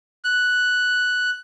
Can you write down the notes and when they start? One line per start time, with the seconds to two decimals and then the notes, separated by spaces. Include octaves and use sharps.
0.24 F#6